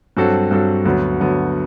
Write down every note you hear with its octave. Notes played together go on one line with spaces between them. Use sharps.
G2 F#3 C4 F#4 A4
G2 F#3 C4 F#4 A4
D2 D3 F#3 B3
D2 D3 F#3 B3